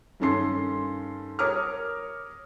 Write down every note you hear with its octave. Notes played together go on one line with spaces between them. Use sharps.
G2 D#3 C#4 A4 C6 C7
A#4 C#5 A#5 D6 D#6 F6